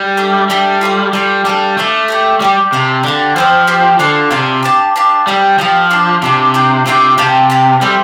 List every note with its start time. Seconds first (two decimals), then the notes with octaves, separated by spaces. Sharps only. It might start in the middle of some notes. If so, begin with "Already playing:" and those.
Already playing: G3
0.17 A3 D4 G4
0.49 G3 A3 D4 G4
0.81 F4 A4 D5 F5
1.13 G3 F4 A4 D5 F5
1.45 G3 D4 A4 F5 A5
1.77 A3 D4 A4 F5 A5
2.08 G4 D5 G5
2.40 G3 G4 D5 G5
2.72 C3 G4 F5 A5
3.04 D3 G4 F5 A5
3.36 F3 C4 G4 C5
3.67 C4 G4 C5
3.99 D3 F4 D5 F5 A5
4.31 C3 F4 D5 F5 A5
4.63 D4 G4 F5 A5
4.96 D4 G4 F5 A5
5.27 G3 C4 G4 F5 A5
5.58 F3 C4 G4 F5 A5
5.91 D4 F4 D5 A5
6.22 C3 D4 F4 D5 A5
6.54 D4 F4 D5 G5
6.86 C3 D4 F4 D5 G5
7.18 C3 G4 F5 A5
7.50 G4 F5 A5
7.81 G3 A3 C4 G4 C5